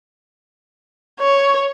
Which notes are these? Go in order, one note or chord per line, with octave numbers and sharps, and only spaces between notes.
C#5